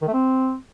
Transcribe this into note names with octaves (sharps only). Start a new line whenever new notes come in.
D#3
A3
C4